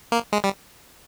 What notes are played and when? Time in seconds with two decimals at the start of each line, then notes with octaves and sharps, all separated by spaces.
0.12 A#3
0.33 G#3
0.44 G3